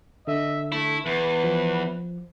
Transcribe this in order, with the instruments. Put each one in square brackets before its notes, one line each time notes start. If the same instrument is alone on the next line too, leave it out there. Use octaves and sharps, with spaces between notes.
[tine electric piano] D3 [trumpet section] D#5 E5
[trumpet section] A3 [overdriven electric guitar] E4
[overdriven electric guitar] E2 [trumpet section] B4
[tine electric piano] F3